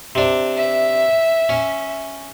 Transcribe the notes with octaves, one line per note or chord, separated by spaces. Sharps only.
C3 D4
E5
C#4